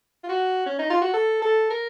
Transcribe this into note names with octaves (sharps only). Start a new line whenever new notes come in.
F4
F#4
C#4
D#4
F4
F#4
A4
A4
A#4